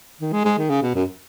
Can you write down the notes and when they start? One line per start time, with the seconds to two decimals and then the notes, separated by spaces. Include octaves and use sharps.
0.20 D#3
0.32 G#3
0.45 G#3
0.58 D#3
0.69 C#3
0.82 B2
0.95 F#2